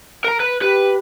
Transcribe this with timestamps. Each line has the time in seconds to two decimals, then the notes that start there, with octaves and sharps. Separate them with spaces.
0.24 A#4 A#5
0.40 B4
0.62 G4 B4